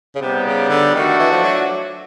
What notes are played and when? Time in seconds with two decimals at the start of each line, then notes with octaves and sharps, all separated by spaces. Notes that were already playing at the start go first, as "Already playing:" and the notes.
0.16 C#3
0.21 C3 G3 B3 D#4 G4
0.46 C#3
0.69 D3
0.94 D#3 A3 D4 F#4
1.19 E3
1.31 F3
1.43 F#3